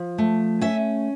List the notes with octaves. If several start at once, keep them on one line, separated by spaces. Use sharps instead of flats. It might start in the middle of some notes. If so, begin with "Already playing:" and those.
Already playing: F3
A3
C#4 E5